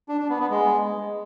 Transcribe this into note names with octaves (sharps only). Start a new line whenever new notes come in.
D4
D4
B3
B3
G#3